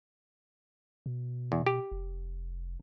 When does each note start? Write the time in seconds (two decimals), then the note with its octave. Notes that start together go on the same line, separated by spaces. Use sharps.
1.06 B2
1.52 E2
1.66 G4
1.92 F1